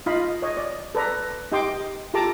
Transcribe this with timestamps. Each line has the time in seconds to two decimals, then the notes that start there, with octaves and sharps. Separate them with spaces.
0.06 D#4 F4 D#5 F5 B5
0.42 C#5 D#5
0.57 D5
0.95 A4 B4 D5 A#5
1.52 D#4 G4 D#5 G5 C6 D6
2.14 F4 G4 A4 A5 A#5 D6